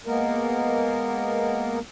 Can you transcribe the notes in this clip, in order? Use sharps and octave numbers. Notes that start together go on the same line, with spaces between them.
G#3 A#3 B3 A#4